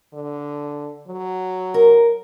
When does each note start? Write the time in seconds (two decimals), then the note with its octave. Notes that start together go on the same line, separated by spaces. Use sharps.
0.13 D3
1.08 F#3
1.74 A#4